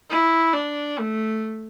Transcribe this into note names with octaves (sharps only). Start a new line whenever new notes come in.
E4
D4
A3